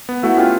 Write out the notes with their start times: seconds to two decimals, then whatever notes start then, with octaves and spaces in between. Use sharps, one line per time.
0.09 B3
0.23 A3 E4 F#4
0.37 C#4 F4 G4